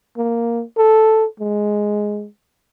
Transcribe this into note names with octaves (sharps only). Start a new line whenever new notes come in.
A#3
A4
G#3